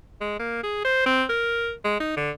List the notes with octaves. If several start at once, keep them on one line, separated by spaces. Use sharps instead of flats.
G#3
A#3
G#4
C5
C4
A#4
G#3
D#4
D3